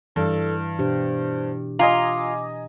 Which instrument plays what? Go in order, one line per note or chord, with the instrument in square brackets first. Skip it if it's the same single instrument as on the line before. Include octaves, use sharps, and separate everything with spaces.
[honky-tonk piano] G2 [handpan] E3 [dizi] A4
[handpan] B2 D4 G4 [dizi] C5
[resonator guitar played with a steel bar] F4 [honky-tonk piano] D#5 G#5 A#5 [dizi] D6